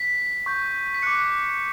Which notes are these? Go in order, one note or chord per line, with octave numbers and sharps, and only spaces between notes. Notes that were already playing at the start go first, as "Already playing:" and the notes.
Already playing: B6
C#6 G6
B6
D6 F#6 C#7